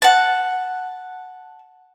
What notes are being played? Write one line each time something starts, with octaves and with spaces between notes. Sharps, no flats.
F#5 A5